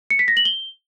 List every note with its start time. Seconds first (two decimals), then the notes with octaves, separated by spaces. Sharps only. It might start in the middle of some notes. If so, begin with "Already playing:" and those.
0.10 C#7
0.19 B6
0.28 A#6
0.37 F#7
0.45 G7